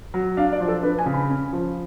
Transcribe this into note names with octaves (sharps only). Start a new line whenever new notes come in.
F#3
D4 F5
D5
F3
A4
D4 B4
G#5
C#3
B5
C#4
F3